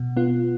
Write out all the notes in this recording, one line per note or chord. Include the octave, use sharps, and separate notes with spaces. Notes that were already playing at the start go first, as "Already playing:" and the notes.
Already playing: B2
B3 F4